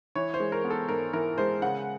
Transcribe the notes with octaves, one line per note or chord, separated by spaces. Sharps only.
E3 C#5
C5
G#3
A#4
B3
A4
G#2 A#4
E3 A#4
G#3 C5
C#3 F#5